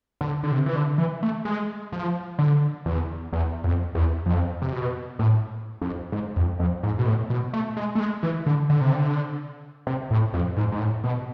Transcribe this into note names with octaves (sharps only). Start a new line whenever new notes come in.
D3
D3
C3
E3
D3
E3
A3
G#3
F3
D3
E2
E2
F2
E2
F2
C3
B2
A2
F2
G#2
F2
F2
G#2
B2
A2
B2
A3
G#3
A3
G#3
E3
D3
D3
C3
D3
C3
A2
F2
G#2
G#2
A2
B2